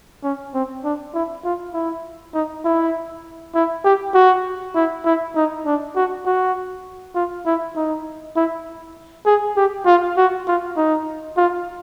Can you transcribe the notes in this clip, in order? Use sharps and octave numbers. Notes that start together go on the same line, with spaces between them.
C#4
C4
D4
E4
F4
E4
D#4
E4
E4
G4
F#4
E4
E4
D#4
D4
F#4
F#4
F4
E4
D#4
E4
G#4
G4
F4
F#4
F4
D#4
F4